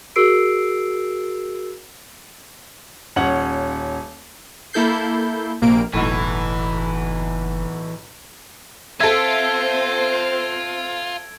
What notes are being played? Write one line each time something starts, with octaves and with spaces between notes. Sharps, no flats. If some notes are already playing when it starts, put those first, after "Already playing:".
F#4 G#4 A#4 E6 C7 D7
D#1 C#4 F#5 F#7
A#3 E4 A4 G6 C7
A#1 C3 A#3 D7
F#1 B1 E2 A2 E3
C4 F4 A4 C5 E5 G#6 D7